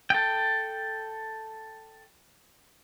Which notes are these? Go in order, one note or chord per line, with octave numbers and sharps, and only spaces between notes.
A4 G5